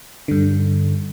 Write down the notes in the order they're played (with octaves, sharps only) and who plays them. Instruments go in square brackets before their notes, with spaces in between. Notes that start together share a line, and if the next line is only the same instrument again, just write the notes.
[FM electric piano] G2 D3